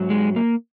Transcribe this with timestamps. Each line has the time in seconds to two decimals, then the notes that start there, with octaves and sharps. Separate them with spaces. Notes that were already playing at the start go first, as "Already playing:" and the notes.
Already playing: G#2 F#3
0.10 G#3
0.36 A#3